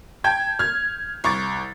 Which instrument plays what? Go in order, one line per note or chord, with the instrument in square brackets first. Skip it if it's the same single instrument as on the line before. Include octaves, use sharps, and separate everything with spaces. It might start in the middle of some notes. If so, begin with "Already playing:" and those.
[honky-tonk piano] G5 A5 G6 G#6
F6 G#6
C2 C#6 D6 A6